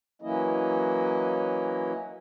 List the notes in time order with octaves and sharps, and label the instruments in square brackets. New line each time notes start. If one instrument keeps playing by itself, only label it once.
[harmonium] E3 F#3 A#3 C#4 E4 D#5